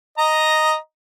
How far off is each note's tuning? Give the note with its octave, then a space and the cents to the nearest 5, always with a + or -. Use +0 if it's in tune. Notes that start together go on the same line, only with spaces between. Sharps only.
D#5 +0 A#5 +0